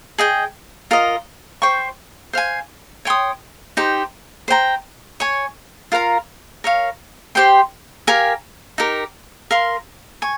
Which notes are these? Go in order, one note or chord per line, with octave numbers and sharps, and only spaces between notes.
G#4 D#5 G5
F4 A#4 D#5
C5 G5 C#6
C5 F5 G#5
C#5 G5 C6 D#6
D#4 G4 C5
C5 G5 A#5
C#5 G#5 C#6
F4 A#4 F5 A#5
A#4 C#5 F5
G4 C5 G5 C6
G4 A#4 F5 G#5
D#4 G4 A#4
A#4 F5 C6
G#5 C#6